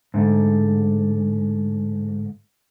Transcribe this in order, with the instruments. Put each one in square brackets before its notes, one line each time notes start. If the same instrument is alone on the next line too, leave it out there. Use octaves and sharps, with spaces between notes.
[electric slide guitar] G#2 D3 A3